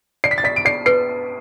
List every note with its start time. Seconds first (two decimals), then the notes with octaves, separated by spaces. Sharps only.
0.24 D5 C7
0.31 B6
0.38 A6
0.44 D5 B6
0.56 D7
0.65 D5 C7
0.86 B4 C7